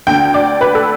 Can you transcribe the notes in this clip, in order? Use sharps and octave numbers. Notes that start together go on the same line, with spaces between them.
D2 D3 G5
D5
B4
A4